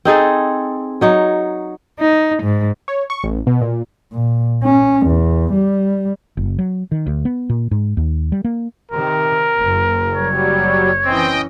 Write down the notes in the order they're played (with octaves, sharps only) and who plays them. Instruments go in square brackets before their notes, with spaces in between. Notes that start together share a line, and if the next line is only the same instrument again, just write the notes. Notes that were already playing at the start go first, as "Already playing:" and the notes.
[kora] C4 D#4 G#4 A4
F#3 D#4 C#5
[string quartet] D#4
G#2
[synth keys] C#5
C#6
A1
B2
A#2
[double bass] A#2
C#4
E2
G3
[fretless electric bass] F#1
F#3
D#3
D2
B3
A#2
G#2
D#2
G3
A#3
[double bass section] C3 D#3 [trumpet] A#4
[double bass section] F#1
[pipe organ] F#3 G3 [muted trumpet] C#5
[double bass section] E3 C#4 [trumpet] C4 [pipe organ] D#5 G5